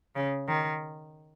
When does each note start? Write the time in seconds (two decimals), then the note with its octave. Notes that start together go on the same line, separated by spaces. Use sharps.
0.15 C#3
0.48 D#3